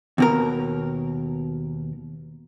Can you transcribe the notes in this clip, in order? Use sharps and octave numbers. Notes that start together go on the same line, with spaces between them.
D#2 B2 A#4